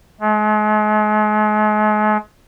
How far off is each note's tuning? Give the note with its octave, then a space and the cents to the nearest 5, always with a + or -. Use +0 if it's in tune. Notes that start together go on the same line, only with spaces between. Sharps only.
G#3 +40